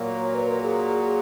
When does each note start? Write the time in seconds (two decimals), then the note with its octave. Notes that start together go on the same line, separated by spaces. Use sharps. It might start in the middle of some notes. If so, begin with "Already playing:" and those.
Already playing: A#2 F#3 A#3
0.21 C#5
0.35 B4
0.48 A#4
0.63 G#4